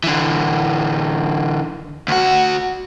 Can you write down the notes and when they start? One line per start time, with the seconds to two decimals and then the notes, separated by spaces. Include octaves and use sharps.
0.04 D3 E3
2.08 D2 F#4